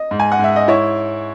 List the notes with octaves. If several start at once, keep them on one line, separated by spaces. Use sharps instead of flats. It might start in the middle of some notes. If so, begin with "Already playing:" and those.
Already playing: D#5
G#2
G#5
F#5
G#2 E5
D#5
E4 C#5